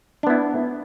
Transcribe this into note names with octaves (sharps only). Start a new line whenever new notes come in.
B3 D4 E4